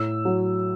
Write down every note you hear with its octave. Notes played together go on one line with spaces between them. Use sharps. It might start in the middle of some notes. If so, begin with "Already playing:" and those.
Already playing: A2 E6
F#3